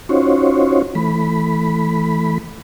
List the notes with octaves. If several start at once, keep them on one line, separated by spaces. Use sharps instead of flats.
C#4 D#4 F4 F#4 C5 C#5
E3 A3 B5